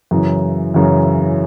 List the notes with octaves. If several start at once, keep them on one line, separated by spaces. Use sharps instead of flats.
F#2 C#3 E3
F#2 C#3 E3